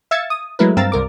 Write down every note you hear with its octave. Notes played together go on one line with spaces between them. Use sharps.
E5 F5 E6 G#6 A6 C#7
D#6
F#3 G#3 A3 E4 A#4 B4
G2 C4 F5 A#5 E6 A6
C2 A#4 D6